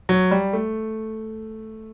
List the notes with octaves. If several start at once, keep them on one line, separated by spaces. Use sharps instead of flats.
F#3
G3
A3